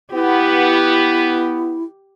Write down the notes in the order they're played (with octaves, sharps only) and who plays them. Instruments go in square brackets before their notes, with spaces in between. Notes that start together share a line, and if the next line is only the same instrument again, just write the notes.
[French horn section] B3 [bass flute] E4 [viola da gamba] G4